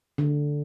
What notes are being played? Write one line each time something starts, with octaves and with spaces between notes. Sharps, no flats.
D3